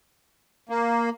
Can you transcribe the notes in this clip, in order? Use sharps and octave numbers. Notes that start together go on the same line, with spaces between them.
A#3